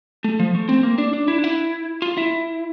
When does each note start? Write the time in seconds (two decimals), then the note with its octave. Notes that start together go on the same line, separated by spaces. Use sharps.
0.24 A3
0.39 F3
0.55 A3
0.69 C4
0.83 A#3
0.98 D4
1.13 D4
1.28 E4
1.39 D4
1.44 E4
2.02 F4
2.17 E4